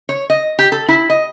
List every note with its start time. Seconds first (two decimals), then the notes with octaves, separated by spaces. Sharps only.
0.09 C#5
0.30 D#5
0.59 G4
0.72 A4
0.88 E4
1.10 D#5